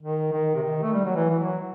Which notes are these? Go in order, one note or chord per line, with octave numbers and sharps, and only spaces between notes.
D#3
D#3
C3
D#3
A3
G3
F#3
E3
E3
F#3